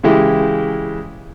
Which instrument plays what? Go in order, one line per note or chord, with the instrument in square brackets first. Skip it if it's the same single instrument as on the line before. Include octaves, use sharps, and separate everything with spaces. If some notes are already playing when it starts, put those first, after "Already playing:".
[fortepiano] C#3 E3 G#3 E4 G4